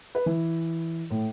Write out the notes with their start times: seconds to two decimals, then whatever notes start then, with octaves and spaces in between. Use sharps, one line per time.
0.15 B4
0.26 E3
1.11 A2